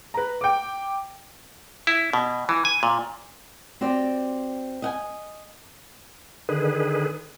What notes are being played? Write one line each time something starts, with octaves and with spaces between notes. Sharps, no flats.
B4 A#5
G5 D6
E4
B2
E3
G#5
A#2
C4 F#4 G4 D5
D#5 F#5 G#5
D3 D#3 G#4 B4